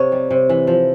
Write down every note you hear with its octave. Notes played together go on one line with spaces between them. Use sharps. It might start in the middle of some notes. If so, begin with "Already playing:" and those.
Already playing: C3 C#5
G3
C3
E3
F3